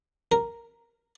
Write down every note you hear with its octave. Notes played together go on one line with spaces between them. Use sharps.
A#4